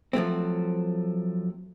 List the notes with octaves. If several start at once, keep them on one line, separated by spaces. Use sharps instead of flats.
F3 F#3 A3 C4